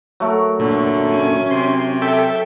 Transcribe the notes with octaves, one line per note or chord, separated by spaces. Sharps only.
F#3 A3 A#4
A#2 D3
C#4
C3 C6
A4 E5 G5